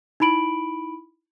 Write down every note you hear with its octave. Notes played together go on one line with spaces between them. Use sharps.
D#4 E4 B5 D7 F#7